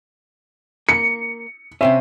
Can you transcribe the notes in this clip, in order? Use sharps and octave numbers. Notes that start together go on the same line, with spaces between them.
A#3 C#7
C3 C4 C#4 E5